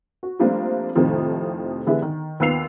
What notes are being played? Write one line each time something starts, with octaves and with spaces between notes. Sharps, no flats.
F#4
F3 G3 A3 A#3 C4 D4
F2 A2 C3 D#3 F3
D3 E3 G#3 B3 E4 G4
D#3
D#2 B3 F4 E6 C7 F7